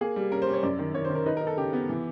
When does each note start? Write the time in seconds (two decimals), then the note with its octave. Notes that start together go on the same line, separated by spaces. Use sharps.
0.01 A#3 G#4
0.16 G3
0.31 C#4 A#4
0.42 C5
0.47 G3
0.53 C#5
0.63 F#2 D5
0.79 D#3
0.94 D#3 C#5
1.05 C5
1.10 D#3
1.15 A#4
1.26 D#4 B4
1.37 A#4
1.41 D#4
1.47 A4
1.57 C#3 G4
1.73 B3
1.89 E3